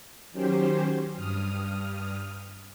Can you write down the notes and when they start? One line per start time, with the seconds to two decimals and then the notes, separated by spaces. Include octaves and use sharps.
0.32 D#3 F#3 C#4 G4 C5
1.13 G2 D#6 F6